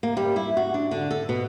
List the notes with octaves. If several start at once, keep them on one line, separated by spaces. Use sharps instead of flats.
A#3
G3
E4
F#4
D4
D3
A4
B2